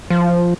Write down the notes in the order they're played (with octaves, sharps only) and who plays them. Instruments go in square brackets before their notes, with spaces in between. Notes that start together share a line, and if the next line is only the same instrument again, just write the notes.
[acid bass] F3